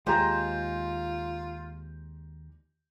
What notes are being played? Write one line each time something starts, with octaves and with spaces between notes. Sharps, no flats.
D#2 G#3 F4 G4 C5 A#5 A#6